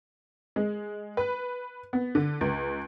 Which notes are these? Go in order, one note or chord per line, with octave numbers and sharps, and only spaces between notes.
G#3
B4
B3
D3
C#2